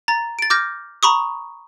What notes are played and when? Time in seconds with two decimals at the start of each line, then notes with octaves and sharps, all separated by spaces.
0.08 A#5 A6
0.39 A6 D7
0.50 D6 F6 G6 A#6
1.03 A#5 B5 C#6 D#6